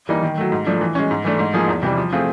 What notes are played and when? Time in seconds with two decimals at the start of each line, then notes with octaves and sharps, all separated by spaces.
0.09 E3 G3 A#3 D#4
0.23 D#3
0.38 F#3 A3
0.52 G#2
0.67 F3 A3 D4
0.81 E3
0.95 G#3 C#4
1.11 G#2
1.24 E3 A3 D4
1.39 G#2
1.54 F3 A#3 D#4 G#4
1.68 E2
1.83 C3 E3 G3
1.97 F3
2.12 A3 C4 F4 G#4